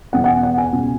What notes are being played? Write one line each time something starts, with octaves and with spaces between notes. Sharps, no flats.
E2 B2 F#5
F#5
G#5
F#5
G#5
C#2 B2